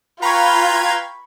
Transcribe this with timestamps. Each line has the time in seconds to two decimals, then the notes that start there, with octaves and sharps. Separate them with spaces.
0.22 F4 B4 F5 G5 A#5 B5 C#6 G#6